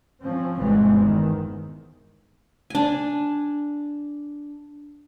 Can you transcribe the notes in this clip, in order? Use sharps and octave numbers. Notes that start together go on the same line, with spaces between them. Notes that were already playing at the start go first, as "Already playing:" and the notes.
F3 C4 C#4
G1 G2 B2 E3 G#3 C4
E2 D#3
D4 G#5